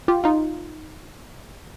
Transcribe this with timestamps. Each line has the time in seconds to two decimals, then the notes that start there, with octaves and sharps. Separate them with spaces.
0.08 F4 G4
0.24 D#4 F4